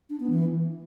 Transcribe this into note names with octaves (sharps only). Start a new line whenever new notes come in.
D4
B3
E3